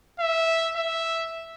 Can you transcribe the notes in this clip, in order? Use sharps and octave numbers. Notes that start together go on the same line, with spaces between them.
E5
E5